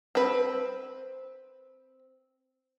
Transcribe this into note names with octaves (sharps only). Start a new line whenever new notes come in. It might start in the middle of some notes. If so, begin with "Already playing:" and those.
C4 B4